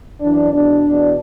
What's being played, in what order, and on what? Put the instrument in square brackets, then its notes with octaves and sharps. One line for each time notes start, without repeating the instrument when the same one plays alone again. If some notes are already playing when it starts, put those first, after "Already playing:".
[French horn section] F#2 E3 D4
E2 B2 D4
E2 B2